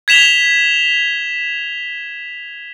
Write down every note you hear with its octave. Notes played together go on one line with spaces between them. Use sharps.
G#6 B6 E7 F7 G7